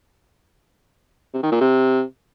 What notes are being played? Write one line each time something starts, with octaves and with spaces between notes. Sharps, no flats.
C3
D#3
A#2
C3